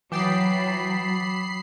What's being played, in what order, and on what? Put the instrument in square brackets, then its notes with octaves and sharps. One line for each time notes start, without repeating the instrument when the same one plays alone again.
[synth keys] E3 G5 A6 [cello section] F#3 [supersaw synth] B5 C7 [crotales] D6 D#6